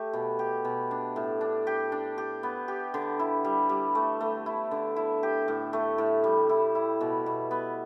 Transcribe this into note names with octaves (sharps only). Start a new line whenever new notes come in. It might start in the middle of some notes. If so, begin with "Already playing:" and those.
Already playing: A3 G4
B2
G4
B2
D4
A2
D4
G4
D4
G4
B3
G4
D3
E4
G3
G3
A3
A3
E4
D3
E4
G4
A2
A3
A2
G3
E4
E4
B2
B2
B3